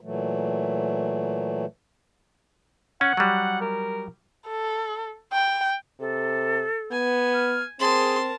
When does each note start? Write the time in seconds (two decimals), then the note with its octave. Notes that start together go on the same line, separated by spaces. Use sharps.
0.01 A#2 E3 F#3 A3
3.01 C#4 F#5
3.17 F#3 G3
3.61 A#4
4.48 A4
5.33 G5
6.00 C3 A4
6.91 B3 G#5
7.34 F6
7.80 C4 G#4 A#4 A5 C6